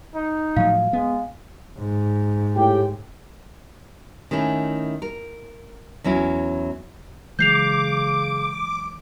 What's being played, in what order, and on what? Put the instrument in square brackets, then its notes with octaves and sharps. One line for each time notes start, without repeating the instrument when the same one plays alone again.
[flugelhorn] D#4
[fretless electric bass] A2 F3 F#3 [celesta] F5
[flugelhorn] G#3 [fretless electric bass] B3
[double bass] G#2
[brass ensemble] A2 G4 G5
[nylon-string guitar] D#3 A3 C#4 E4
A#4
E2 F#3 C#4 E4
[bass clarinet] C#3 [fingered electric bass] E3 F#3 G#3 [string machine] D6 [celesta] G6 C7 F7